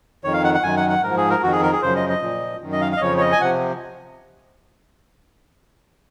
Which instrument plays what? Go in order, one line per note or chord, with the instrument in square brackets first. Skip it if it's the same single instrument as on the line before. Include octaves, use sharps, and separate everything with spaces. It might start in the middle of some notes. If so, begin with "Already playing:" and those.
[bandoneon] F2 D#3 C#5
F5
F#5
F#5
F#2 D#3 G#5
F#5
F#5
G#2 F3 A#4
G#4
A#4
F2 D#3 F#4
G#4
A#4
G#4
F#2 C#3 F3 C5
D#5
D#5
A#2 F3
F#2 D#3
D#5
F5
F5
D#5
F2 C#3 F3 C#5
C#5
D#5
G#5
C3 F3 F#5